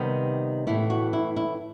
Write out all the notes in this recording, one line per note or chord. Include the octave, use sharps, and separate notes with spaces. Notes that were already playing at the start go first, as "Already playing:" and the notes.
Already playing: C3 D#3 G3 B3
A2 E3 B3 E4
F#4
E4
E4